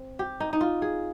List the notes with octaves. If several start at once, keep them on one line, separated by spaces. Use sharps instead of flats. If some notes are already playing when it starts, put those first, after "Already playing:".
Already playing: C4
G4
D#4
D#4
F4
G#4